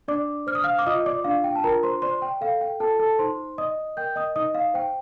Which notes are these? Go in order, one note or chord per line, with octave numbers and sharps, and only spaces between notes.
D4 D5 D6
C5 F6
D#6
F5 F6
D6
F4 D#5 D#6
D5 D6
D4 F5
G5
A5
F4 A#4 A#5
C5 C6
C5 D5 C6
G5
A4 F5
G5
F4 A4 A5
A4 A5
D#4 C5 C6
D5 D#5 D#6
A#4 G5 G6
D#5 D#6
D#4 D#5 D#6
F5
C5 G5